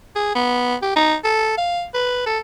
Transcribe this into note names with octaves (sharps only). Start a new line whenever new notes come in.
G#4
B3
G4
D#4
A4
F5
B4
A4